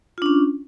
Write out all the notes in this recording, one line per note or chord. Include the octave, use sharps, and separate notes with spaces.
C#4 D4 F4